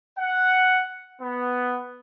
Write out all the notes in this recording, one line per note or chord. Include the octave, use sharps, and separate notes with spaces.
F#5
B3